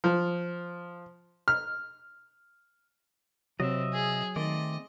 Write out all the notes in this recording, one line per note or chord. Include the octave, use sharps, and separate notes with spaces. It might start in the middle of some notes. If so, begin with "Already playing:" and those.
F3
F6
C3 F#3 C4 D#5 E5
G#4
D#3 A3 C4 D5 D#5